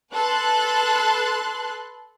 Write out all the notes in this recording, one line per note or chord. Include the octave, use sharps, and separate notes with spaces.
A4 B4 A5 C6 F#6